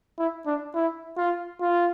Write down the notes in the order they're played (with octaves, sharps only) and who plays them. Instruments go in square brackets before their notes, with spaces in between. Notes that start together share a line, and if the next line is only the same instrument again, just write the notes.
[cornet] E4
D4
E4
F4
F4